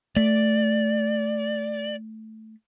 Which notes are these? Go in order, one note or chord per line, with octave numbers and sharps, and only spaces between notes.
A3 D5